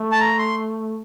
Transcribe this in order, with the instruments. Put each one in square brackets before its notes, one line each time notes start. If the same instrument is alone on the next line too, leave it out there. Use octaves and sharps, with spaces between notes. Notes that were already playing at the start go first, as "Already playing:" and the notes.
Already playing: [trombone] A3
[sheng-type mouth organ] A5
A#5
C6